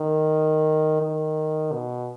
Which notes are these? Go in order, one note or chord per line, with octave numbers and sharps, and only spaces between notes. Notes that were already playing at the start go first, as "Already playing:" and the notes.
Already playing: D#3
D#3
B2